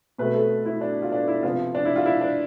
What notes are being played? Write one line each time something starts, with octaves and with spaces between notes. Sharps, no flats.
B2 A3 C4 B4
A4
E4
D4
F4
D4
E4
C3 F3 B3 F4
D4
E4
F4
E4
D4